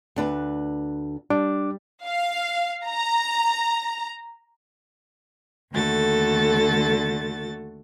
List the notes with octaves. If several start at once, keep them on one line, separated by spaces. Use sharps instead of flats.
D2 D4 B4
G3 D4 D6
F5
A#5
D#2 D3 A3 F#4 A4 A6